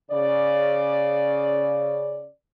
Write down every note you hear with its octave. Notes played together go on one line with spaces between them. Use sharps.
C#3 D5